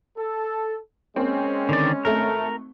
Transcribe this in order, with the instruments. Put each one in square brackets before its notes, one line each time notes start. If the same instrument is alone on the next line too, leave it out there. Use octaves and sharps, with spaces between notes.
[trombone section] A4
[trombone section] G#3 C#4 [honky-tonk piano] A#3 C4
[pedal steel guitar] D3 D#3 D5
[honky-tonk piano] G#1 A3 [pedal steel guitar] A#4